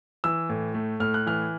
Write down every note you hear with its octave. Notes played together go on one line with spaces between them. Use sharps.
E3 E6
A2
A3
A2 F6
F#6
E3 F6